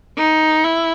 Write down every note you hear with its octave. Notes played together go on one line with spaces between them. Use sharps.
D#4
E4